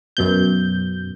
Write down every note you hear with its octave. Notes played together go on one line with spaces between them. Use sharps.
F#2 B2 G6